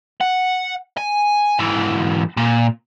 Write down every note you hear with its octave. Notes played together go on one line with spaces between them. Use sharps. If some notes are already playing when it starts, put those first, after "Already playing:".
F#5
G#5
G#2 E3
A#2